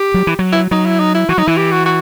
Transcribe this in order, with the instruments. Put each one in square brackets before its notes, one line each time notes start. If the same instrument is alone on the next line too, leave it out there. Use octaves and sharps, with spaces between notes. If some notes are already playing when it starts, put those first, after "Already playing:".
Already playing: [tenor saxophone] G4
[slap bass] F#3
E3
F#3
[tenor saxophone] E4
[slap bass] F#3 [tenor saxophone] D#4
[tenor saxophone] E4
D#4
E4
[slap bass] E3 [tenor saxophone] F#4
[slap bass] F#3 [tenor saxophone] D#4
[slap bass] E3 [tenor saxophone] E4
[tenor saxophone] G4
F#4
F#4